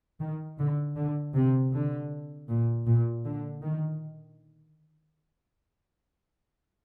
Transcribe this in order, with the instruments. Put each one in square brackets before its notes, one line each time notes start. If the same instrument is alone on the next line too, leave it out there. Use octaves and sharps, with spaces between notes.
[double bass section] D#3
D3
D3
C3
D3
A#2
A#2
D3
D#3